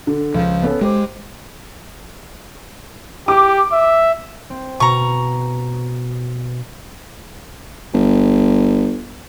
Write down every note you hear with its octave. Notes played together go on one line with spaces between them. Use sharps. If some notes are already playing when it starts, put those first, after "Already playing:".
D3
C#2 F3
B3 C#4 A4
G#3 G4 C5 D6
G4 D6
E5
C4
B2 A#5 C#6
G1